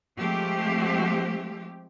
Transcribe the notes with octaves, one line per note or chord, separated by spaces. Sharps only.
F3 G#3 A3 C4 G4